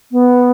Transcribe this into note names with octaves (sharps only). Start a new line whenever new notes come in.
B3